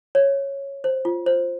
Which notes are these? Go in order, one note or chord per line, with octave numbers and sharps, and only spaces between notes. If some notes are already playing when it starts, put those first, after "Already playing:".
C#5
C5
F4
C5